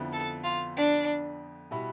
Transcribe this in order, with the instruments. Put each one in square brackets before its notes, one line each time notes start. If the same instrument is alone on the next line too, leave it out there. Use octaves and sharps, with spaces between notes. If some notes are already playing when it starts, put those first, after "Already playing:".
Already playing: [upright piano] F2 D3 F3 B3 E4
[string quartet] A4
F4
D4
[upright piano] B2 G3 B3 E4